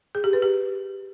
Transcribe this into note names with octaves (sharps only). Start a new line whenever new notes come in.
G#4
G4
B4
G4